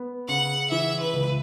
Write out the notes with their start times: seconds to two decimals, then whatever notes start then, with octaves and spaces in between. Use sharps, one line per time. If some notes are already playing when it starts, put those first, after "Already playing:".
Already playing: B3
0.28 C#3 F#5
0.71 E3 E5
1.00 B4
1.13 C#2